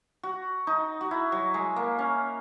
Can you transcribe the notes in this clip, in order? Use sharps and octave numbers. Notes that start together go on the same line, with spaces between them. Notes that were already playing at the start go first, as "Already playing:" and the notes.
F#4
D#4
F#4
E4
F#3
G#3
A#3
C#4